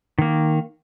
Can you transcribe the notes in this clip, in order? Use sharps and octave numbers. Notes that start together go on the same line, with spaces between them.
D#3 A#3